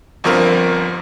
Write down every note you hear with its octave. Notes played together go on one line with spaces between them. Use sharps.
G1 G2 F3 C4 A#4